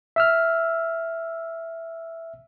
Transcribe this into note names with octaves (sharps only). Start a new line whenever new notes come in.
E5 E6 F6